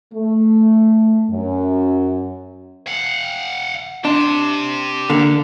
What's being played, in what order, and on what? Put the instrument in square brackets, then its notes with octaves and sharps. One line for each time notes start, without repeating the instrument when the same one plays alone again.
[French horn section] A3
F#2
[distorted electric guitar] F5 F#5
[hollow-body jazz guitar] D4 [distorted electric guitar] G4 C6
[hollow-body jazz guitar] D3 A#3